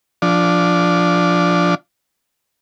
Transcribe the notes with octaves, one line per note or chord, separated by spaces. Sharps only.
F3 D4